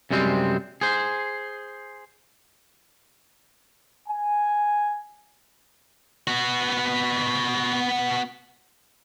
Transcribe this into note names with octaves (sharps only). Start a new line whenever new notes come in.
F#2 C3 G3 G#3 C4
G#4 C5
G#5
B3 F#4